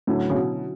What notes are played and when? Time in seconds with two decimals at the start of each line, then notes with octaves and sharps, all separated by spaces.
0.07 A2 D3 F#3 C#4 E4
0.30 C#3
0.34 B2